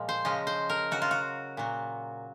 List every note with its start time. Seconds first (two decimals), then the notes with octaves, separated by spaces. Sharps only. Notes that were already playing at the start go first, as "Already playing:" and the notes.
Already playing: A#2 F3 G#3
0.09 C5
0.25 C#3 F3 G#3 D#5
0.47 C5
0.69 A#4
0.91 C#3 F#3 F#4
1.02 F4
1.11 F#4
1.57 A#2 F#3